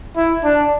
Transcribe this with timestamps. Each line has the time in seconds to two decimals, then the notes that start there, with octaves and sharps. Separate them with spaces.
0.16 E4
0.44 D4